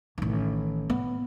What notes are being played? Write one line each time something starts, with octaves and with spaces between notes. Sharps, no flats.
A1 D#3
B3